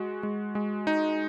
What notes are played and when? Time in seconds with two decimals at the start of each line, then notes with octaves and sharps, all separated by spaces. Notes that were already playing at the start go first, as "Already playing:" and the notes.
Already playing: G#3 F#4
0.23 G#3
0.55 G#3
0.87 D#4